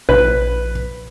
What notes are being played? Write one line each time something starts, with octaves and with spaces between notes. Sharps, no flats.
A#1 B4